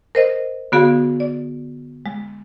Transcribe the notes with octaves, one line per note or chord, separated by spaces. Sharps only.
A#4 C5 D#5
D3 B3 F#4 G#4 F5
D5
G#3